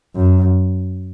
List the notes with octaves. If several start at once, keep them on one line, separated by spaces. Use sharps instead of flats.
F#2